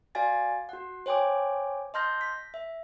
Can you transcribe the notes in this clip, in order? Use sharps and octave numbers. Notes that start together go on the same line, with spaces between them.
F#4 D5 F5 G#5 A6
F#4 F#5
C5 C#5 G5 G#5 D6
D#5 A5 C6 F6 G6 A#6
B6
E5